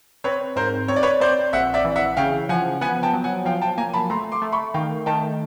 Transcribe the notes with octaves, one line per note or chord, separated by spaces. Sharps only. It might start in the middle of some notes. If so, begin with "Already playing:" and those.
C4 B4 C#5
G#2 A#4 C5
C4 C#5
D5
B4 C#5
C4 C5 D5
A#1 E5 F#5
D5 E5
E3
E5 F#5
C#3 F5 G5
F3 F#5 G#5
B3 F#5 G#5
G5 A5
F#3
F#5 G#5
F3 F5 G5
G5 A5
A#3 G#5 A#5
A5 B5
A3 A#5 C6
C6 D6
A3
B5 C#6
D#3 F5 G5
D#3 G5 A5